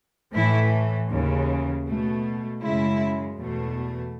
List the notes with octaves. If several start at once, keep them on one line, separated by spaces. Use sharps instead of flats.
A2 E3 A3 E4
D#2 C#3 E3
B2 A3
F#2 C#3 G#3 E4
E2 B2 A3